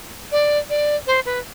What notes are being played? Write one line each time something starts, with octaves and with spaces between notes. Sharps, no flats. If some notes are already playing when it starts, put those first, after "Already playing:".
D5
D5
C5
B4